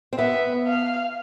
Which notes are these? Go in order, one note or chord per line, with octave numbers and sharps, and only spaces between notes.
C4
B3 E5
F5